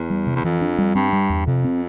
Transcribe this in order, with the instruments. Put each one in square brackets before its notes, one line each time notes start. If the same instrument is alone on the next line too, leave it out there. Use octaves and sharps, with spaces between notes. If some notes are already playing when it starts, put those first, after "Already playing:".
Already playing: [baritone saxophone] E2
[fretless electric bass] G3
C3
[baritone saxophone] E2
[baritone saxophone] F2 [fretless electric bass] E3
[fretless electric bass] D4
G3
[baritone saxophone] G2 [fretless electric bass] C4
[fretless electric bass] G3
E2
[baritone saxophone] F2 [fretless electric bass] C3
[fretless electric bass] C4